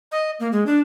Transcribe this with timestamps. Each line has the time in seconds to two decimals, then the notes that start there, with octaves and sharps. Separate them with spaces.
0.12 D#5
0.40 A#3
0.52 G#3
0.66 D4